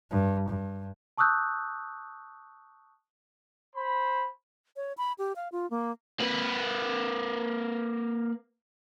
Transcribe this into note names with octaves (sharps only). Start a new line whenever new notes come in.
G2
G2
A5 C#6 D#6 E6 F#6 G6
C5 B5
C#5
B5
G4
F5
F4
A#3
A#3 B4